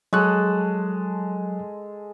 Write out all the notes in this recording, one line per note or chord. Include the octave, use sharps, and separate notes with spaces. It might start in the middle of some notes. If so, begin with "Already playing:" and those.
F#3 G#3 A4 C#6 F#6